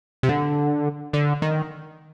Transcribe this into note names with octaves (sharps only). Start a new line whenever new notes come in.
C3
D3
D3
D#3